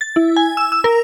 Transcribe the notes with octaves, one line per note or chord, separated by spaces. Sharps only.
A6
E4
G#5
E6
E6
A#4